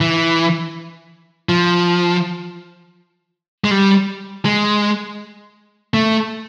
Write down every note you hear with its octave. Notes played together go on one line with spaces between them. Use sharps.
E3
F3
G#3
G3
G#3
A3